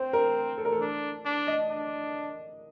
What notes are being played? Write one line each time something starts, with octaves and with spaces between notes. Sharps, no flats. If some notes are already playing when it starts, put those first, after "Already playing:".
Already playing: C4 C5
A#4
A4
A#4
A4
D4
D4
D#5
D4